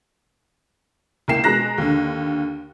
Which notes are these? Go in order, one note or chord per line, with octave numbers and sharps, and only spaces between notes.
C#2 A#3 E4 G5 C7 E7
B2 G#3 A#5 F#6 A#6
D#2 D3